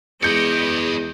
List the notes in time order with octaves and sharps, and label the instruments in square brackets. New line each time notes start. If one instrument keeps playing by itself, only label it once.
[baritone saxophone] E2 [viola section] G#3 D#5 [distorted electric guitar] B4 D5 [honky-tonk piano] G6 C#7